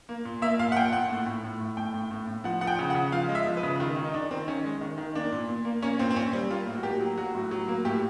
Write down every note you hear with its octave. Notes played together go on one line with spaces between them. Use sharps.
A#3
A#2
A#3 E5
A#2 F5
F#5
A#2 G5
A#2 F#5
A2
A2
A2
A2
A2 G5
A2
A2
A2
F3 F#5
F3 F#5
G5
C#3
F#5
C#3
F3 F5
G#3
E5
F3
B4
C#3
D#3 F4
D#3
D#4
D#3 D4
D#3 C4
D#3 C#4
G#3
D#3
D#3
A#3 D4
A#2
A#2
A#3
A#3 C#4
A#2 C4
C4
A#2 C#4
G3 C4
A#3 F4
A2
F#4
A#3 G4
F#3
F#3 F#4
A2
F#3
A#3
A2 G4